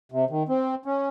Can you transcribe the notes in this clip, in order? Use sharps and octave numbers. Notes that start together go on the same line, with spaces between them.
C3
D#3
C4
C#4